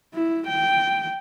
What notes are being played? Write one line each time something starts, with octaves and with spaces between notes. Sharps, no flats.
E4
G5